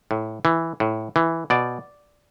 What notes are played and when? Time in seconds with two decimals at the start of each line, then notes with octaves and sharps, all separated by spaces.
0.11 A2
0.45 E3
0.80 A2
1.16 E3
1.50 B2 D5